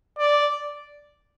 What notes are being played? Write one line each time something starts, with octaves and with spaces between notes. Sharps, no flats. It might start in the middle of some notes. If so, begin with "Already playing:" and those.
D5